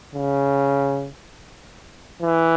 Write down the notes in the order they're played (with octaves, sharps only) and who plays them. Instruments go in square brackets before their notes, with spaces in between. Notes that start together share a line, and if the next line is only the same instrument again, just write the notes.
[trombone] C#3
E3